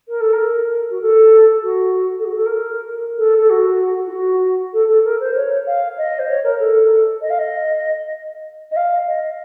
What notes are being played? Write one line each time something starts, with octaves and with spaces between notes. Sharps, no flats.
A#4
A4
A#4
F#4
A4
F#4
A4
F#4
A4
A#4
A4
A4
F#4
F4
F#4
A4
A4
A#4
C5
C#5
F5
D#5
C5
C#5
A#4
A4
D#5
F5
D#5
D#5
F5
D#5